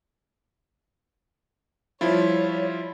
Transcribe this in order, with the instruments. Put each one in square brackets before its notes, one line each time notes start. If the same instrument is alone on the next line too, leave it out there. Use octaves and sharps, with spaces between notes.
[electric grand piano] F3 E4 F4 [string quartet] G3 C#5